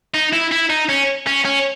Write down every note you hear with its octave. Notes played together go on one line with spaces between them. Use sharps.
D#4
E4
E4
D#4
C#4
C#4
C#4